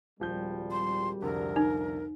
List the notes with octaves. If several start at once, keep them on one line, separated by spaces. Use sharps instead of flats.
D#1 G#1 F3 G3 G6
C6
C2 F2 D3 A#4
D#4